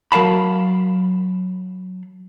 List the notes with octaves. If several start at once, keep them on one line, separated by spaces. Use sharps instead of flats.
F#3 A#4 F5 A5 B5